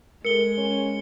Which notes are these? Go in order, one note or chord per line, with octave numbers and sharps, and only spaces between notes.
G#3 A4 A#4 C#7 G7
C#4